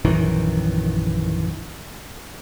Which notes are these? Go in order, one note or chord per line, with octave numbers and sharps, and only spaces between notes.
A#1 F#2 D#3 E3